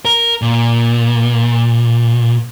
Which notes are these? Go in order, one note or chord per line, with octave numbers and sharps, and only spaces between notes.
A#4
A#2